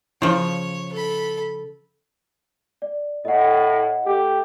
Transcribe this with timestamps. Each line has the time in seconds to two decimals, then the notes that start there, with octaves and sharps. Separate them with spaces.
0.22 C#3 F3 E4 C#5
0.92 A4 B5
2.82 D5
3.25 A2 D#5 F#5
4.05 A3 G4